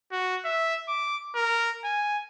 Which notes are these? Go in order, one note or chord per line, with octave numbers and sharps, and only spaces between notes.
F#4
E5
D6
A#4
G#5